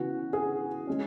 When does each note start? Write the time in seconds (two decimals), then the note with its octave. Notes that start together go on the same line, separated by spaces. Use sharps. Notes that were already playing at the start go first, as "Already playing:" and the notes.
Already playing: C#3 E3 B3 F#4
0.33 G#4
0.87 G#3 C#4